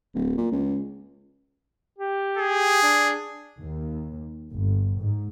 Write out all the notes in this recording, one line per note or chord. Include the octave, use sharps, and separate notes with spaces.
D1
A#2
C#2
G4
G#4
D4
D#2
G1
G#2